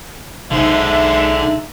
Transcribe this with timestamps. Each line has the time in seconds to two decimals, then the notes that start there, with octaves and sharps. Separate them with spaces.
0.51 B1 D3 G#3 D#4 C5 E5 A#5